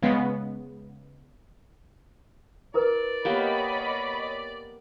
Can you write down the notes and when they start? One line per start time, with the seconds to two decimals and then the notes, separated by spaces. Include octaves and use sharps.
0.02 C#3 G#3 B3
2.74 E4 A#4 B4 D5
3.25 A#3 B3 G4 C#5 D#5 B5